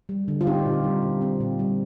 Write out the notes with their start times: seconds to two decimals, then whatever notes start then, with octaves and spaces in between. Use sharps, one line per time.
0.09 G3
0.28 D3
0.41 F4
0.47 C4 D#4 G4
0.66 A#2
0.84 G3
1.02 A#2
1.21 C4
1.40 A#2
1.59 G3